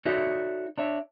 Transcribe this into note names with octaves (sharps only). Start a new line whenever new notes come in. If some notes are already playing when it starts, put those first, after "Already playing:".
D#4 F#4 A4 C#5 D5 E5
D4 C#5 E5